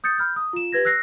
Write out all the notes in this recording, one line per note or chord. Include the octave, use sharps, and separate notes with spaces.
D#6 G6 A6 C#7
B5 F6 G6
D#6
F4 E7
G4 B4 G#6 A#6
E6 F#6 A#6 C7